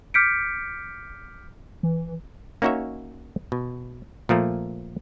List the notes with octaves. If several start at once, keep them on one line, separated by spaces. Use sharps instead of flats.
D6 F6 G6 B6 C#7 D7
E3
A#3 C#4 D#4 F#4 C#5 E5
B2
A#2 F3 A3 A#3